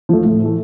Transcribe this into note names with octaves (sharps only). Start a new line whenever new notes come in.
F3 A3
A2
E3 A3